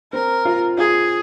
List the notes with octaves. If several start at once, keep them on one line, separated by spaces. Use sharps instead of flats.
C4 A#4
F4
F4 G#4